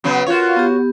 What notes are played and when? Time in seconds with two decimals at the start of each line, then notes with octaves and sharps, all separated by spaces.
0.04 C#3 F#3 B3
0.27 F4 F#4 A#4 C#5 F5
0.56 B3 G4